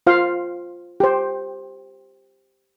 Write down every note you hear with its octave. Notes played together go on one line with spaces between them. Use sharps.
F4 C5 F5
G4 C5